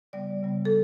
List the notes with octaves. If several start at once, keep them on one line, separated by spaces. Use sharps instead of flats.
C#3 G3 B3 D5
C#3 G3 B3
A4